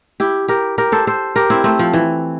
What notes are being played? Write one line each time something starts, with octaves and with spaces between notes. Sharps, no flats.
E4 G4
G4 A#4
G4 A#4
A4 C5
A4 C5
G4 A#4
C4 E4
A3 C4
F3
E3